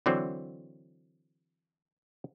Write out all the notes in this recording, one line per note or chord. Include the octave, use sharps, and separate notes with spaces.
D3 E3 F#3 C4